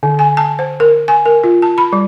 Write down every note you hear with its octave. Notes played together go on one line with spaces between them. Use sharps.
D3
G#5
A5
C5
A#4
G#5
A#4
F4
A5
B5
G3